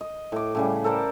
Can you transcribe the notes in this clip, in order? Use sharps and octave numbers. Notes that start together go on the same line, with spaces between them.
D#5
A2 D6
A2 C#3 G3
A4 A#4 C5 D5